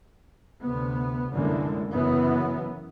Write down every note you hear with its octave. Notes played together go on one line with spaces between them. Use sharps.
D2 C3 B3
C2 F#2 D3 E3 G#3 A#3
F#1 F#2 C#3 E3 F#3 B3